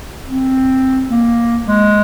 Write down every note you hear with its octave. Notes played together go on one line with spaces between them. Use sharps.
C4
A#3
G#3